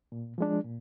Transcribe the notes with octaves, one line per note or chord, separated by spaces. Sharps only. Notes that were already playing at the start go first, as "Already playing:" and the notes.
A#2
F3 G#3 D4
A#2